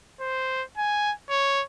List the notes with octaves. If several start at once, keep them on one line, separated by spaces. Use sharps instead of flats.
C5
G#5
C#5